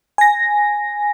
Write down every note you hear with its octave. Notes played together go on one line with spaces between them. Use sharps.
G#5 A#6